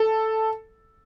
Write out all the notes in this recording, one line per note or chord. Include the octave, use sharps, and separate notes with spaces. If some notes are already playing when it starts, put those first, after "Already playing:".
Already playing: A4